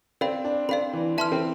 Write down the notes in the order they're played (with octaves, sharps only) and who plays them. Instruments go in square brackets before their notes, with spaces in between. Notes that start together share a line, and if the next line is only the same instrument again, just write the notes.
[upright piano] C4 [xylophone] D5 F5 B5
[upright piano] D4
[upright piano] C4 [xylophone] D5 F5 B5
[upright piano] E3
[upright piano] E3 [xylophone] E5 A5 C6 F6
[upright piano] C4